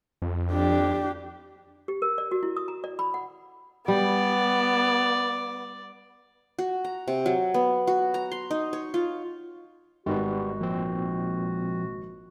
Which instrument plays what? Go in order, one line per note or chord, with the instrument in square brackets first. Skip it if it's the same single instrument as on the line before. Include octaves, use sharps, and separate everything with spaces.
[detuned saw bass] F2
[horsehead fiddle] D4 G4
[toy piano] G4
A#4
D5
F#4
E4
D#6
A#5
D5
B5
F#5
[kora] G3 [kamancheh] B3 [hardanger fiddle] D5
[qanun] F#4
A#5
C3
F#3
B3
F#4
A#5
C6
D#4
C#5
F4
[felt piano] G#1 [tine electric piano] G3 B3 [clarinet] F#4
[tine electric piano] A#2 C4 [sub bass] F3